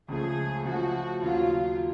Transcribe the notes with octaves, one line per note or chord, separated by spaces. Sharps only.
C#2 C#3 F3 A3 G#4
C#3 F3 A3 F#4
D#2 C#3 F#3 F4